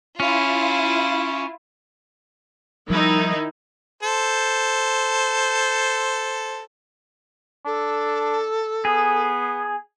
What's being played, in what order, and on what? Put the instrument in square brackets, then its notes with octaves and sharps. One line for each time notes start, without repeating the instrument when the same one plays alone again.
[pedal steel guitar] C#4 [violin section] E4 F4
[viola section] D#3 D#4 E4 [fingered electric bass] F3 G3
[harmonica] A4 C5
[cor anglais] D4 [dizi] A4
[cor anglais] B3 [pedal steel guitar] G#4